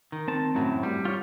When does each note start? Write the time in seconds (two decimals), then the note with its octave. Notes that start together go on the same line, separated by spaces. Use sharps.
0.12 D#3
0.28 C4 A5
0.55 F#2 A2 F#3
0.83 G3
1.05 F4 C#5